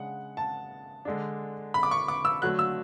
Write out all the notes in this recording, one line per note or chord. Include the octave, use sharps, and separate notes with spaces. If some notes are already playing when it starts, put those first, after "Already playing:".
Already playing: C#3 G#3 D4 F#5
A5
D3 G#3 D4
B5
D6
C#6
D6
E6
D3 F#3 A3 F#6
E6